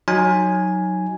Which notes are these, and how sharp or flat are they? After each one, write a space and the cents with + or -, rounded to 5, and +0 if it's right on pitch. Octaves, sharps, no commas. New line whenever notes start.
F#3 +0 D#4 +0 G#5 +0